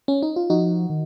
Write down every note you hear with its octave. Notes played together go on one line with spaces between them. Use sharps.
C#4
D#4
F4
F3 D#4 F#4
D#3